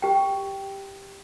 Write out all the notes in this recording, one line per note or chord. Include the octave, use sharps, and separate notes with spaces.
G4 G5